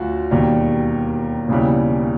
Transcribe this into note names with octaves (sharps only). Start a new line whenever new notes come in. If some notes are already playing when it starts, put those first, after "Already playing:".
Already playing: D2 F#3 F4 F#4
E1 D#2 D#3 G3
E1 D#2 C#3 E3 G3